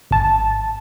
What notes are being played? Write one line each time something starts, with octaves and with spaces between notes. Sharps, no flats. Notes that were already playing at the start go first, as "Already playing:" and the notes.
G#1 A5